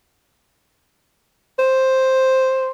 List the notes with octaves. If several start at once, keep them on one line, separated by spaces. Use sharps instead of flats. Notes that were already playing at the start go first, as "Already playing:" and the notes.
C5